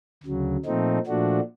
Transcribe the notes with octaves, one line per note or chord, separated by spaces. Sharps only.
D2 C#3 F#3
A#2 F3 A3 C4 D#4
A#2 F3 A3 D4 F#4